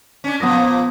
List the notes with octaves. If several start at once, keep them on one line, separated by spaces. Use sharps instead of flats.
C#4 D4
A#2 F3 B3 D#6 A#6